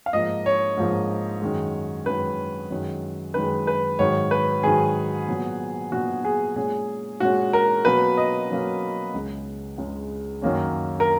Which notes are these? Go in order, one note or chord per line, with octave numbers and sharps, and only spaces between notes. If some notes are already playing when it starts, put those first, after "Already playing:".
F5
G#2 F3 A#3 D#5
C#5
G#2 F3 A#3
F#2 D#3 G#3
F#2 D#3 G#3 B4
F#2 D#3 G#3
F#2 D#3 G#3 B4
B4
G#2 D#3 F#3 C#5
B4
G#2 D#3 F#3 G#4
A#2 F#3 B3
A#2 F#3 B3 F#4
G#4
A#2 G#3 C#4 G#4
A#2 G#3 C#4 F#4
A#4
B2 F#3 A#3 C#4 B4
D#5
B2 F#3 A#3 C#4
C#2 C#3 G#3
C#2 C#3 G#3
F#2 D#3 A#3 C#4
A#4